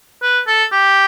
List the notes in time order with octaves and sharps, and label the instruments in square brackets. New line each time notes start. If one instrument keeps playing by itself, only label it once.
[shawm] B4
A4
G4